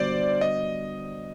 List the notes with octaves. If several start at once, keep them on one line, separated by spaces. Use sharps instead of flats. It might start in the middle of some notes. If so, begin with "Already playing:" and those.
Already playing: D3 G3 B3 D4 F#4 C5 D5
D#5